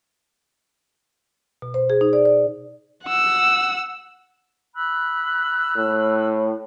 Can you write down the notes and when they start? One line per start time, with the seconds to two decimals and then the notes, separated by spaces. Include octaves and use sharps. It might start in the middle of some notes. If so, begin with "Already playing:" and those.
1.62 B2
1.74 C5
1.90 G#4
2.01 D#4
2.13 D5
2.25 D5
3.04 F#5 E6
4.75 B5 E6 F#6
5.77 A2